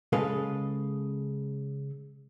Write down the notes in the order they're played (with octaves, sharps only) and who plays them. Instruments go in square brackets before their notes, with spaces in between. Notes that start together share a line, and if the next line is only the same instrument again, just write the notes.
[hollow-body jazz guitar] C#3 G#3 A4 B4 F5